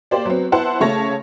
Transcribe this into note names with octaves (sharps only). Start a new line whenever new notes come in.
A#3 G4 C5 D5
F#3 B3 C4
B3 E4 C5 F#5 A5
C#3 A3 C#5 A5 A#6